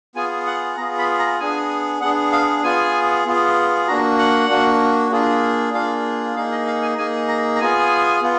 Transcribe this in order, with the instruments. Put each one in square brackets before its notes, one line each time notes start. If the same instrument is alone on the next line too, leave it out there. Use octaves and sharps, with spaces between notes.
[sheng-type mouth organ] B3 F4 G#4 G#5
F#5
B3 F4 G#4 A#5
B5
A#5
B3 D4 G#4 G#5
B3 D4 G#4 F#5
F5
B3 F4 G#4 G#5
B3 F4 G#4
A#3 D4 F#4 A#5
F#5
A#3 D4 F#4
A#3 D4 F4 G#4
A#3 D4 F4 G#4 F5
A#3 D#4 G#4 F5
D#5
F5
G#5
A#3 D#4 G#4 G#5
A#5
A#5
B3 F4 G#4 G#5
B3 F4